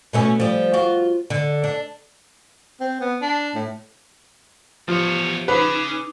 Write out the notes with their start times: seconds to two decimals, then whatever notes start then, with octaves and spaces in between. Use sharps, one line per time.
0.13 B2 A3 C#4
0.40 F3 G3
0.74 F4 F#4
1.30 D3
1.64 D4
2.80 C4
3.01 B3
3.22 D4
3.55 A2
4.88 E2 F3 G4 C#5
5.48 C#4 D#4 G#4 B4 D6